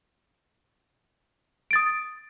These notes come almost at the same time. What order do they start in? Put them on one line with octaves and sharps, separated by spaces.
D7 A6 D#6